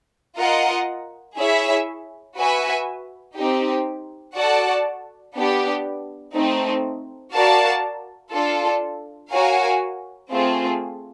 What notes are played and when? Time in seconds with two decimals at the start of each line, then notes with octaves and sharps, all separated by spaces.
0.38 F4 A#4 D#5 F#5
1.37 E4 G#4 C#5 E5
2.37 F#4 B4 E5 G#5
3.36 C4 D#4 G4
4.35 F#4 A4 D5 F#5 A5
5.35 B3 D4 G4
6.35 A3 C4 D#4
7.34 F#4 A#4 D5 F5 A5
8.33 D4 F4 A4
9.32 F#4 A#4 C#5 F5 G#5
10.32 A3 C4 F4 G#4